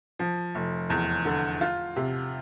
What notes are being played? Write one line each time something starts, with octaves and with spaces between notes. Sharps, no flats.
F3
F1
E2
D3
F4
C3